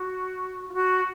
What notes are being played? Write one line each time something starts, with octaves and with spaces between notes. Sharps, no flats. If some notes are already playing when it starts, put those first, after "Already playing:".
Already playing: F#4
F4
F#4